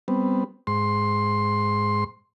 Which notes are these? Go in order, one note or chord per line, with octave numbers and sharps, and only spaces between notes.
G3 B3 C4
G#2 C6